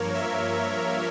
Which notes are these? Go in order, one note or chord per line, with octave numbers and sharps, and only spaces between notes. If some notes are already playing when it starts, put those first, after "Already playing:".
Already playing: G2 F3 A#3 A#4 C#5
E5